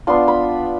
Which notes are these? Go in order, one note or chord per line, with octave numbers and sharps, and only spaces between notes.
B3 D4 F4 C6
B5